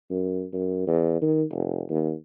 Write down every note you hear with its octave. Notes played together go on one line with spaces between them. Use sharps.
F#2
F#2
E2
D#3
F1
D#2